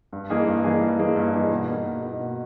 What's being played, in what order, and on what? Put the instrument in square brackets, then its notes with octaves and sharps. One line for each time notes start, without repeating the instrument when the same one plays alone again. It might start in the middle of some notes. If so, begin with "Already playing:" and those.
[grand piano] G2
E3 A#3 D#4 G#4
G2
E3 A#3 D#4 G#4
G2
E3 A#3 D#4 G#4
G2
E3 A#3 D#4 G#4
B2
A#3 D#4
B2
A#3 D#4
B2